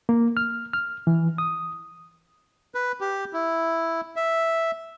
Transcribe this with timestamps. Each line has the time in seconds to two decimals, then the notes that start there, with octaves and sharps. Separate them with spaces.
0.09 A#3
0.37 F6
0.73 F6
1.07 E3
1.38 D#6
2.75 B4
3.01 G4
3.33 E4
4.16 E5